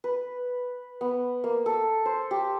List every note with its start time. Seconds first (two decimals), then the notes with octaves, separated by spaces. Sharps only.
0.04 B4
1.01 B3
1.44 A#3
1.66 A4
2.06 C5
2.31 G4